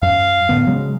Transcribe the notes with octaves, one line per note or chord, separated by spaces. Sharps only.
F#2 F5
A2 D3 B3
C#3 F#3 G#3